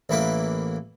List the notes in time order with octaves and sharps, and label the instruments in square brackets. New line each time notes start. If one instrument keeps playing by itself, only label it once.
[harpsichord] A1 E3 A#3 B4 D6